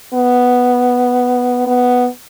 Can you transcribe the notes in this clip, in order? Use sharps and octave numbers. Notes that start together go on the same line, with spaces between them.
B3
B3